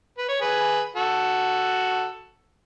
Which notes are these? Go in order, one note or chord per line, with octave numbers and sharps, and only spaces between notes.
B4
C#5
G#4 B4
F#4 A4